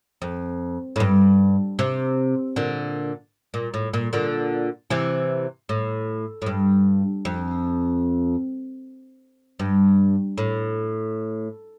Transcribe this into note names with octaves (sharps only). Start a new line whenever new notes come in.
F2
A2
G2
C3
A#2 D3
A#2
A2
A#2
A#2 D3
C3 E3
A2
A2
G2
F2
G2
A2